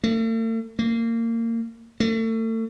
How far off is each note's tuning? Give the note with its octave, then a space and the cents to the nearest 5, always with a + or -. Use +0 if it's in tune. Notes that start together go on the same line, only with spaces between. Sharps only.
A3 +45
A#3 -25
A3 +35